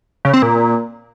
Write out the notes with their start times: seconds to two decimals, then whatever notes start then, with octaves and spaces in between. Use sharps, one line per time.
0.25 C#3
0.34 C4
0.42 A#2